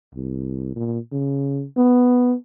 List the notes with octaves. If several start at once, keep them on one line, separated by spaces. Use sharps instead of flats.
C2
A#2
C#3
B3